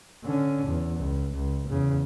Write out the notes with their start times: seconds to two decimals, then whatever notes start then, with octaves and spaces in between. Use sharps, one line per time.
0.24 D3 C#4
0.66 E2
0.99 C#2
1.33 C#2
1.68 E2 C#3